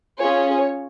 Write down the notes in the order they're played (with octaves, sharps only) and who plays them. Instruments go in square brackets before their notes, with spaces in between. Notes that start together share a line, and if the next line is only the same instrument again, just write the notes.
[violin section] C#4 F4 G#4 C#5